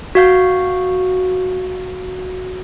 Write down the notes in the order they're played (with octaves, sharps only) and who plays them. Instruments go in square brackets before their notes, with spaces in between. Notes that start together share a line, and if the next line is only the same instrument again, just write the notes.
[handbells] F#4 F5 G6